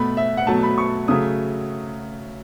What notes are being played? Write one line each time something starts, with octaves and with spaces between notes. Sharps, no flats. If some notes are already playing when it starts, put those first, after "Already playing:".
Already playing: B2 A3 B5
E5
F#5
B2 F#3 A3 A5
B5
C#6
C#3 F#3 A3 D#6